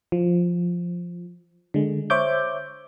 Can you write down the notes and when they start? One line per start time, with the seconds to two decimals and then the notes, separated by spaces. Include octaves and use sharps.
0.12 F3
1.74 D3 G#3
2.10 C5 C#5 E5 D6 G6